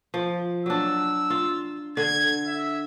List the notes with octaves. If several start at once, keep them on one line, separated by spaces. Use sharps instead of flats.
F3
F#3 D4 E6
F4
D3 G#6
E5